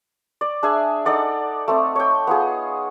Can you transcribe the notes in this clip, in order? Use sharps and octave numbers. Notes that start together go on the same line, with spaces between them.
D5
D4 G#4 E5 G#5
D#4 A4 D5 F#5
A3 C4
C#5 G5
B3 F4 G#4